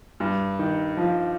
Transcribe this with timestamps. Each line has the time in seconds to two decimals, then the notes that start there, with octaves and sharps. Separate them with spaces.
0.20 G2
0.59 D#3
0.97 F3